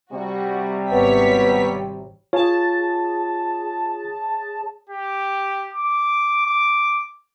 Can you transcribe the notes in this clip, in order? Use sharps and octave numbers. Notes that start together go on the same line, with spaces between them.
C3 G3 F#4
G#1 B3 C#5 B6
F4 G#4 C#5 A5
G4
D6
D6